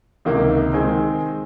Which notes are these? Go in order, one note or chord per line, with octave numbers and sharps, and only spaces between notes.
C#2 C3 D#3 A#3
D#3 G#3 C4